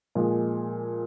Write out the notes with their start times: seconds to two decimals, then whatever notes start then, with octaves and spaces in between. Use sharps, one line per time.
0.15 A#2 F3 G#3